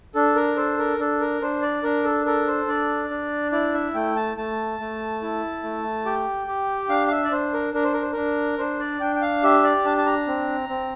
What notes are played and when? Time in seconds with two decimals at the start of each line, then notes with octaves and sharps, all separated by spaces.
0.15 D4 A4
0.35 A#4
0.56 A4 C5
0.78 A#4
0.99 D4 A4
1.20 A#4
1.42 D4 C5
1.62 D5
1.83 D4 A#4
2.04 A4
2.26 A4 A#4
2.47 C5
2.68 D4 D5
3.10 D4
3.52 E4 D5
3.74 E5
3.94 A3 G5
4.16 A5
4.36 A3 A5
4.80 A3
5.22 E4
5.63 A3
6.05 G4 G5
6.47 G4
6.89 D4 F5
7.07 F5
7.11 E5
7.24 D5
7.31 D4 C5
7.53 A#4
7.74 D4 A#4
7.84 C5
7.94 A#4
8.02 C5
8.12 D4 A#4
8.58 D4 C5
8.79 D5
9.00 D4 G5
9.16 G5
9.22 F5
9.43 G4 E5
9.63 D5
9.85 D4 A5
9.97 A5
10.06 A#5
10.27 C4
10.69 C4